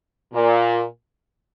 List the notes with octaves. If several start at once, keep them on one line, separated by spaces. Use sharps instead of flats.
A#2